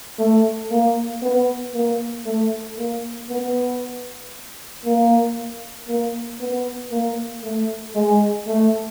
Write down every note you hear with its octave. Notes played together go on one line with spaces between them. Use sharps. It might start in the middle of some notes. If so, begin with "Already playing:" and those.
A3
A#3
B3
A#3
A3
A#3
B3
A#3
A#3
B3
A#3
A3
G#3
A3